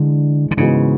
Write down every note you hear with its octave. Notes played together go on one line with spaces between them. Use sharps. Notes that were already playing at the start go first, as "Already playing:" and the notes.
Already playing: D3 E3 G#3 D4
D3
G#2 C#3 E3 G#3 B3 F#4